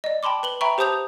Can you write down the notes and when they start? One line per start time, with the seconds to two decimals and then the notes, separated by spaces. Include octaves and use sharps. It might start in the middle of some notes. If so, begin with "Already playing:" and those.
0.04 D5 D#5
0.23 G5 A5 B5 C6 D6
0.43 B4 F#7 G7
0.61 E5 G5 A#5 B5 C#6
0.78 G4 C5 A5 D#6 G6 F7